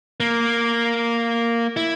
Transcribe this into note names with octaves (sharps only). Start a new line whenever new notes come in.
A#3
E4